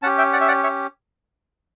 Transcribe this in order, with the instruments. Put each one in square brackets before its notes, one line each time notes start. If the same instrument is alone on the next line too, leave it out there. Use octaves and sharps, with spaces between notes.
[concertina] C#4 F#5 A5
G4
E5 G5
D5 F#5
E5
D5 F#5
C#5 E5